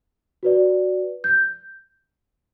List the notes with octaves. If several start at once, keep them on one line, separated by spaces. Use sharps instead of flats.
F#4 B4 D5
G6